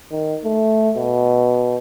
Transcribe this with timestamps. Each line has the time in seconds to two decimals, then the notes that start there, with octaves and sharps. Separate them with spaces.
0.11 D#3
0.44 A3
0.97 B2